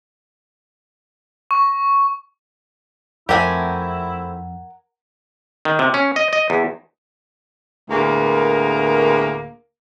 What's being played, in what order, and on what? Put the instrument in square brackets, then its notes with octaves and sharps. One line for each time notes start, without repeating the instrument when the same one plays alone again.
[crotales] C#6
[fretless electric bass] F2 [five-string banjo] A3 C4 G4 [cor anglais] E4 [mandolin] A#4 F#5 G#5
[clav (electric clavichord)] D#3
C3
C#4
D#5
D#5
E2
[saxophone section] D2 A2 A#3 B3 G#4 A#4